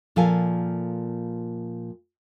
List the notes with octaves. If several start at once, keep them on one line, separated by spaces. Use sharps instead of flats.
A#2 F3 A4 A#4 F5 G#5